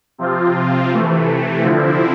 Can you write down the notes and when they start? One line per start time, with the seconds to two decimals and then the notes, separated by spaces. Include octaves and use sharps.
0.18 C3 F3 C4 F4
0.91 C3 E3 A3
1.63 D3 F3 C4 E4